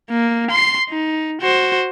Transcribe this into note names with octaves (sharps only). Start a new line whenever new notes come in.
A#3
C6 C7
D#4
F#4 C5